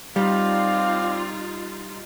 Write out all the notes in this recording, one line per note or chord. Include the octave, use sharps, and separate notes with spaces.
G3 C4 D#4 F4 D5 F5